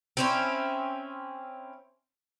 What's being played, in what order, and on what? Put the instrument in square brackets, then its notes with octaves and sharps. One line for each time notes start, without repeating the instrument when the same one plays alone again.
[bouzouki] C4 C#4 E4